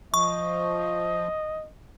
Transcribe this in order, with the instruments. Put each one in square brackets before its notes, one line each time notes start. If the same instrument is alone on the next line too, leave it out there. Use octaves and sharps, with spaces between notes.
[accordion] F3 [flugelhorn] D#5 [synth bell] C#6